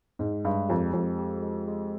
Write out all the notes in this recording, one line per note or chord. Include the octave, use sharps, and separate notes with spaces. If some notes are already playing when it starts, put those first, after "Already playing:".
G#2 G#3
G2 G#3
F2 G4
F2 G4
G4
G#3
G#3